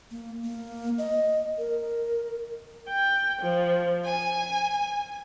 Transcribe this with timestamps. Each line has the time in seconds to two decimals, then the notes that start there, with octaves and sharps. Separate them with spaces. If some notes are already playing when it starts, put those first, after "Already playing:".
0.11 A#3
0.43 A#3
0.98 D#5
1.58 A#4
2.88 G5
3.41 F3
4.04 G#5